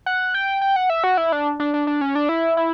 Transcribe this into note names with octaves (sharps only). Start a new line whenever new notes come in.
F#5
G5
G5
F#5
E5
F#4
E4
D4
D4
D4
D4
C#4
D4
E4
E4